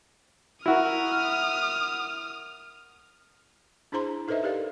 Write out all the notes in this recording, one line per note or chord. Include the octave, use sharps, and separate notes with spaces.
E4 F#4 A#4 D#6 F6
D4 E4 G#4 C5 A#5 C6
D#4 A4 B4 C5 D#5 E5
G4 A4 A#4 D5 F5